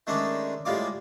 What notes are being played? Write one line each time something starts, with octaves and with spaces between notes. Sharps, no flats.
D#3 G#3 A3 C#4 D4
A2 G3 G#3 F4 F5 D6